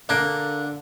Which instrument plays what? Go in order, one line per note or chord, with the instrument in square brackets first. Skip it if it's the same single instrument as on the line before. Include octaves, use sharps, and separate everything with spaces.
[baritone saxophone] D3 [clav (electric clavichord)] A#3 [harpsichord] D4